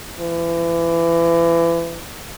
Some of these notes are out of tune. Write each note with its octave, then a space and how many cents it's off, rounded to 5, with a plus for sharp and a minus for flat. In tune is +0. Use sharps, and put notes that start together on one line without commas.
E3 +30